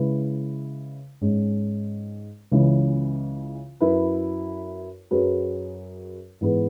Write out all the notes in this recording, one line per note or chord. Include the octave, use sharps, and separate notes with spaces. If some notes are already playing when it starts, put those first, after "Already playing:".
Already playing: C#3 G#3 E4 B4
G#2 G#3 C#4
C#2 C#3 E3 G#3 C#4
F#2 F#3 E4 B4
F#2 F#3 C#4 G#4 B4
G#2 E3 B3 G#4 B4